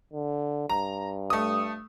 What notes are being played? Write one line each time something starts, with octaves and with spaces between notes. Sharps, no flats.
D3
G2 A#5
A3 D#6